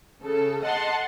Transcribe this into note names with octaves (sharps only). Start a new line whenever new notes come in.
C#3 A4
D#5 F#5 A5 C6